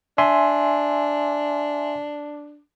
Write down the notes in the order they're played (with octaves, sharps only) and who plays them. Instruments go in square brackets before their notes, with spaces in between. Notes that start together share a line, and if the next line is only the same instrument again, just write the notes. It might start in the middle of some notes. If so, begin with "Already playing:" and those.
[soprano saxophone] D4 [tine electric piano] E5 G#5 C6